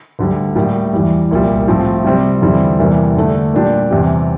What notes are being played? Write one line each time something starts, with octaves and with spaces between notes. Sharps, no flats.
D2 D3 G3
A2 G3 A#3
E2 E3 G3
C2 A#2 G3
A2 F3 C4
C3 G3 C4
E2 D3 G3 C4 E4
E2 C3 E3 G3 A#3
D3 A3 D4
A#2 G3 D4 G4
E2 C3 G3 C4 G4